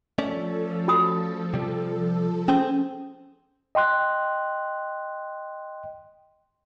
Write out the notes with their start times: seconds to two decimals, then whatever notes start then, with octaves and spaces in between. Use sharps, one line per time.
0.18 F3 A3 C#4 A4 D5
0.88 F#4 B5 D#6
1.54 C3 G3
2.48 C4 C#4 G#4 C5
3.75 D#5 G5 C6 F#6